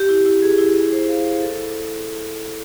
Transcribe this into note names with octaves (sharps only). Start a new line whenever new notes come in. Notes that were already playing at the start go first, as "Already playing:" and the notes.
Already playing: G4
E4
E4
G#4
E4
G#4
C5
F5
C5
A4
E4